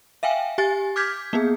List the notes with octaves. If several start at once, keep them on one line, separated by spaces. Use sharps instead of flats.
E5 F5 G5 G#5
G4 G#5 A6
D6 F6 G6 G#6 B6
A#3 B3 G#4